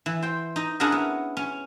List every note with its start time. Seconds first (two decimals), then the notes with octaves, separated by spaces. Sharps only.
0.06 E3
0.22 C5 G5
0.56 D#4 D#5
0.80 C#4 D4 E4 F#4 G#4 A#4
0.92 B3
1.37 C#4